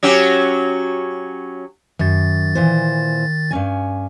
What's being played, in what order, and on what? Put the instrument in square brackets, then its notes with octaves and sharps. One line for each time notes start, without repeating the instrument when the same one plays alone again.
[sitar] F#3 C#4 G4
[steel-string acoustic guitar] F#2 [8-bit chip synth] D#3 A6
[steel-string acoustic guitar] A#2 E3 C5
G2 C#4 G#5